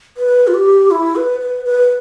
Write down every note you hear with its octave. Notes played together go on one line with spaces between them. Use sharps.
B4
F4
G4
E4
B4
B4
B4